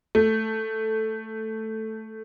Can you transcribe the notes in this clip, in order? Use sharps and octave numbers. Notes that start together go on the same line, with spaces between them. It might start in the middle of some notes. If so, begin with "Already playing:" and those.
A3